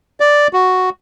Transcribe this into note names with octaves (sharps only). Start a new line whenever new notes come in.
D5
F#4